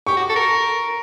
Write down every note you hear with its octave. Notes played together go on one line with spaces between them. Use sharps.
G4 C#6
F#4
A4
A#4